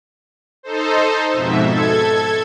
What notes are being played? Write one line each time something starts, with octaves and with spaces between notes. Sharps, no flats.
D#4 A4 C5
F2 G#2 B2 E5
A4 G#6